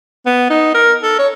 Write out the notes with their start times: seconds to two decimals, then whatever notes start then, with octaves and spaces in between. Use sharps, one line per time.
0.26 B3
0.50 D#4
0.74 A#4
1.03 A4
1.19 C#5